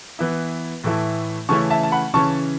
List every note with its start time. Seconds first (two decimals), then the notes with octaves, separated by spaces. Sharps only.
0.19 E3 B3 E4
0.84 A2 E3 A3 E4
1.49 C#3 E3 A3 C#4 E4 A5 C#6
1.70 E5 A5
1.83 A5
1.92 F#5 B5
2.14 C#3 E3 C#4 A5 C#6